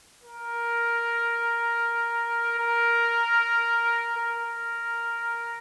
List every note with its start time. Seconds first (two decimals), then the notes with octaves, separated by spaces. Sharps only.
0.22 A#4
2.59 A#4
4.17 A#4